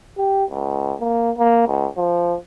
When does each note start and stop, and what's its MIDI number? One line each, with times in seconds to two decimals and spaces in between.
0.18 0.44 67
0.50 0.95 37
1.00 1.31 58
1.38 1.64 58
1.67 1.87 37
1.97 2.36 53